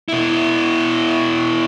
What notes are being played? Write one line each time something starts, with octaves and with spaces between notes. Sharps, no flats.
B2 E4